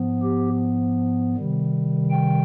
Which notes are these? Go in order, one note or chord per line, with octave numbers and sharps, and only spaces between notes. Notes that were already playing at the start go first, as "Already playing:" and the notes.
Already playing: G#2 F3 B3
G4
C3 D#3 G3
G5